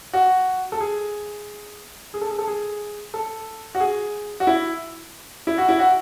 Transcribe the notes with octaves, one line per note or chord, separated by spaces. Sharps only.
F#4
A4
G#4
G#4
A4
G#4
A4
G#4
A4
F#4
G#4
F#4
E4
E4
F#4
E4
F#4